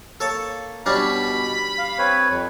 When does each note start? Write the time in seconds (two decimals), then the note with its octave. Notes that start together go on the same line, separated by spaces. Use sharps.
0.20 A#3 A4 C#5 A5
0.86 B2 G3 C#4 D4 B5
1.78 F5
1.98 C4 B4 C#5
2.30 F2